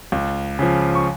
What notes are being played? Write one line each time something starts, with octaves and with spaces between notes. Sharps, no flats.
C#2
C#3 F3
C#6